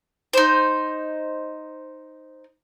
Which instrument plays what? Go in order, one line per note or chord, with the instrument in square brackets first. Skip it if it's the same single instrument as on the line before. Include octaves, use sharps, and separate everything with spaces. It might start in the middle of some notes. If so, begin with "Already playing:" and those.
[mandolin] D#4 C5